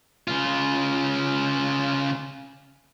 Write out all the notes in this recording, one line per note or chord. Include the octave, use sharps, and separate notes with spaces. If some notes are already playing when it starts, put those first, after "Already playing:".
C#3 F4